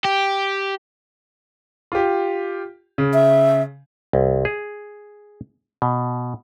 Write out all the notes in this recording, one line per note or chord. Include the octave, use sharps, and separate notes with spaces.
G4
F4 G4
C#3
E5
C2
G#4
B2